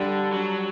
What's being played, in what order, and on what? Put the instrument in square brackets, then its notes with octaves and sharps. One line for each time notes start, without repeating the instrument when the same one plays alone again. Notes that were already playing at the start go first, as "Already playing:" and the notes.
Already playing: [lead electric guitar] D3 [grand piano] G3
[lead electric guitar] F#3